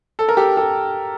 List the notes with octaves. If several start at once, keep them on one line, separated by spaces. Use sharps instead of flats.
A4
A#4
G4 A4
G4 A4